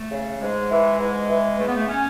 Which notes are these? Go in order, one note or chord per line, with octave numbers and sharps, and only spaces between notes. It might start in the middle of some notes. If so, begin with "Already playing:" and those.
Already playing: A3
C#3
G#2 G#3
E3
G#2
E3
C#3 A3
B3
A3
C#4